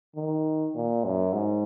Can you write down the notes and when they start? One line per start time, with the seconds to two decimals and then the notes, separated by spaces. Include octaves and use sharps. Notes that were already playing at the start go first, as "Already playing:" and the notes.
0.16 D#3
0.75 A#2
1.05 F#2
1.33 G#2